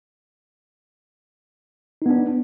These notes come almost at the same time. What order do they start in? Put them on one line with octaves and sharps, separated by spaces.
D#4 B3 D4